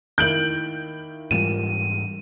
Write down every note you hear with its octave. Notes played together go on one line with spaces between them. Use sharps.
D#3 A#3 E4 G6 D7 F#7
G#2 E3 G3 A#3 F4 D#7 E7